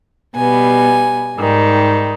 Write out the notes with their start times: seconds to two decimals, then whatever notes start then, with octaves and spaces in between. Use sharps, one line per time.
0.36 B2 G3 B3 G#5
1.37 G#2 D#3 G3